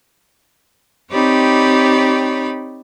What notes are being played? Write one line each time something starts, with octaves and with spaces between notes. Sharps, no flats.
C4 D#4 G4 C#5 D5 B5